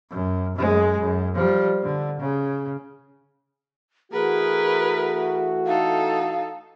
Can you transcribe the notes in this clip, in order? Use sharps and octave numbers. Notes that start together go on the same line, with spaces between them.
F#2
F#2 G#3
F#2
F3 G3
D3
C#3
E3 A3 F#4 G#4 A#4 B4
D#4 A4 F5